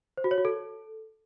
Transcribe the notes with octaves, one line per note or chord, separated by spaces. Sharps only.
C5
F#4
C#5
F#4
A4